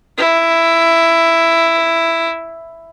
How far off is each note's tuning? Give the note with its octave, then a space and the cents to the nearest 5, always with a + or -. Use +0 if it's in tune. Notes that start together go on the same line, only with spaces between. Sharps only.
E4 +10